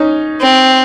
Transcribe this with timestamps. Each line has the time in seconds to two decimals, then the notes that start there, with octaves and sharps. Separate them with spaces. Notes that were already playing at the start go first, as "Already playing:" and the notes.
Already playing: C#4 D#4
0.41 C4